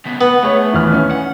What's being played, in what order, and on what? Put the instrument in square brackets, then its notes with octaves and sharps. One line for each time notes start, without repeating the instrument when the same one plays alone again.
[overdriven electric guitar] C#3 B3
[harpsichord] B3 [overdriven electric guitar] F#5 [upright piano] B5
[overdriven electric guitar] A3 [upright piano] G#4 C#5
[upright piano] D#1 E3 F6
C#4
[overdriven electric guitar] F#5